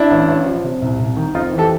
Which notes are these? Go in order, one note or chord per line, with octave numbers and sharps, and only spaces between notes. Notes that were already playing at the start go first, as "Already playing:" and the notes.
Already playing: D4 E4
A1
A1
F3
C3
C2
C2
D#3
F2 D#4 F4
E3
G4 A4